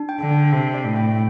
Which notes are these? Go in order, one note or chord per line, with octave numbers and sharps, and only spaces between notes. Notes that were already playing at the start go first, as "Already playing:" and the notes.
Already playing: D4
G5
D3
D4
C3 G5
D5
A2
G5